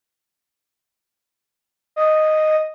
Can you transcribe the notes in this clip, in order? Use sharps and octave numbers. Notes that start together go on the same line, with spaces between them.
D#5